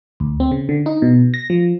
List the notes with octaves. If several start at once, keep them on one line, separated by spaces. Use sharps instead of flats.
D2
C4
C#3
D3
D#4
B2
A#6
F3